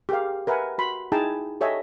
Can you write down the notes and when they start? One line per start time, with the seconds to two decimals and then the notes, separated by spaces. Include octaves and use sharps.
0.09 G4 G#4 A#4 F5
0.47 A#4 B4 E5 F#5 G#5
0.78 F#4 B5 C6
1.12 D#4 E4 G#4 G5 A5 A#5
1.61 G4 A4 C#5 D#5 E5 G#5